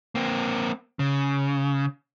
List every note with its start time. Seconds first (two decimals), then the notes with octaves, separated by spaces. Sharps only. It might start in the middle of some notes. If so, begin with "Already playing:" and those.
0.15 A#3 C4
0.99 C#3